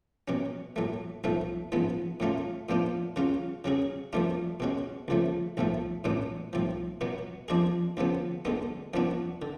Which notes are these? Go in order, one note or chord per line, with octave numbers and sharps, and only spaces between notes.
B2 F#3 C#4
A2 F#3 A3
B1 A2 F3 A3
A1 G#2 F3 B3
A2 F#3 A3 C#4 F4
A2 F3 B3 D4 F4
C#3 F#3 C#4 F4
C#3 F#3 C#4 G#4
F#2 F3 A3 D4 F4
B2 G#3 C#4 F#4
C#2 C#3 F3 A3
B1 A2 F3 A3
A1 A2 F#3 B3 D4
B1 A2 F3
B2 F#3 B3 F#4
F2 F3 G#3 D4 G#4
D2 C#3 F3 B3
D2 D3 G#3 B3
F#2 F3 B3 D4 F#4
D3